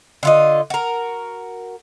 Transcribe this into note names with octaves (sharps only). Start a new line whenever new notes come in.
D3 F4 D#5
F#4 A#4